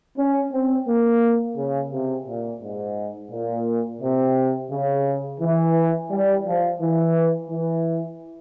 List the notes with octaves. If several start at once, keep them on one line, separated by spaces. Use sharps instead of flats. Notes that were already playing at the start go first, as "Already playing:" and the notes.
C#4
C4
A#3
C#3
C3
A#2
G#2
A#2
C3
C#3
E3
G3
F3
E3
E3